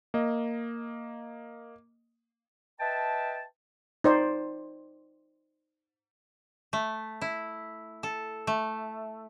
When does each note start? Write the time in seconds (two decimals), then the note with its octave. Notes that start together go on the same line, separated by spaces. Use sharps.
0.14 A#3 D#5
2.79 B4 D#5 E5 G5 A5
4.04 D#4 C5 D5
6.73 A3
7.21 E4
8.03 A4
8.47 A3